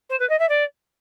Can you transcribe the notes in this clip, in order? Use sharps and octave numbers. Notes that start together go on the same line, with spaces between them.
C5
B4
D#5
E5
D5